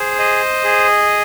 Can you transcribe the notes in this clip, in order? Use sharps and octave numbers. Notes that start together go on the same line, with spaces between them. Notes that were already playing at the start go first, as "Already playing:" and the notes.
Already playing: G#4 C5
D#5
G#4